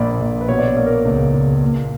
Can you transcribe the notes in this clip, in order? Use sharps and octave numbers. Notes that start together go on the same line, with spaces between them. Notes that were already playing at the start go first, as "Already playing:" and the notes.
Already playing: A#1 A#2 A#3 D5 B5
A#1
B4
B2 C#5
D5
C#5
A#3
A#4
C#2
C#2
A#2